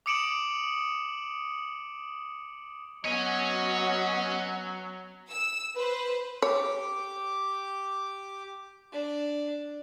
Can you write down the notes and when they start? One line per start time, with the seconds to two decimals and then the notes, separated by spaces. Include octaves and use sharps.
0.06 D6 D#6 C#7 D7 E7 F#7
3.05 F#3 B3 C#4 F#4 C#5 D#5 G#5
5.31 E6
5.75 B4 C5
6.42 G4 C#5 D6
8.92 D4